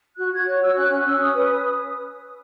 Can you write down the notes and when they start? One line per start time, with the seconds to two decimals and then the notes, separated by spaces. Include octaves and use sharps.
0.16 F#4 F#6
0.32 F#4 G#6
0.46 C#5 F#6
0.60 F#4 E6
0.75 C#4 F#6
0.91 C#4
1.05 C#4 E6
1.19 C#4 D#6
1.34 B4